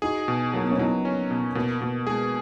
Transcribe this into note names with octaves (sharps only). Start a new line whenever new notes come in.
D#4 F#4 G#4
B2
F#3 A#3
B3
C#4
F#3 B3 D#4
C#4
B2
B2 A#3
B2 A#3
G#3 B3 G#4